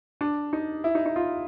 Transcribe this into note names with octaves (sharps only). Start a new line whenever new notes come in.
D4
D#4
E4
D#4
D#4
F4